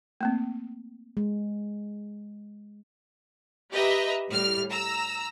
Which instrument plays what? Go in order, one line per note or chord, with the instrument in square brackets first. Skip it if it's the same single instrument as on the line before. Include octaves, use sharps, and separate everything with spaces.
[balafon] A3 A#3 C4
[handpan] G#3
[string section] G4 B4 D#5 E5 A#5
A2 G3 F6
A#5 E6